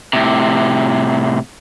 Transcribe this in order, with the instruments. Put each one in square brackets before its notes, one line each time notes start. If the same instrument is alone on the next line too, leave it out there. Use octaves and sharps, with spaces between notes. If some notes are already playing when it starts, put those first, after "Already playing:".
[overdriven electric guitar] A2 C3